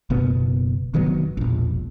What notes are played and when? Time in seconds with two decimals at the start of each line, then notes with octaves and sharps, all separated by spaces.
0.10 F#1 B2 B3
0.94 F1 D#3 F#3 B3
1.37 E1 A#1